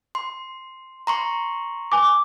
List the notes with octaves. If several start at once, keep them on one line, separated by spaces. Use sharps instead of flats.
C6
A#5 C6 C#6
G#5 D6